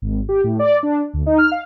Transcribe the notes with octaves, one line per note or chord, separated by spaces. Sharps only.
G#1
G4
A2
D5
D4
D2
D#4
F6
F5